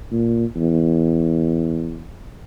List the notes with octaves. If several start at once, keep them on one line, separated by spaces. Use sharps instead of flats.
A#2
E2